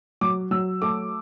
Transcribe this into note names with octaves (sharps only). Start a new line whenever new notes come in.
F#3 D6
F#3 E6
A3 D6